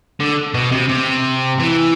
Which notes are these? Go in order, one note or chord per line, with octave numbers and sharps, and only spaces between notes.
D3
B2
C3
C3
E3